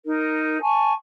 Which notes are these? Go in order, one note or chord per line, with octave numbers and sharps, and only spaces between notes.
D#4 A#4
G#5 A5 C#6